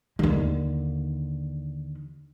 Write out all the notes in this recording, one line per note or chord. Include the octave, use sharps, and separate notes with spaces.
D#2 D3